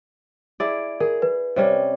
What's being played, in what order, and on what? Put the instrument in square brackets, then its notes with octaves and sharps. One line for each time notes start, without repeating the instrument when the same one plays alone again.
[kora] E4 G#4 D5
[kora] G#4 [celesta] A#4
[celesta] B4
[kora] C3 G3 C#4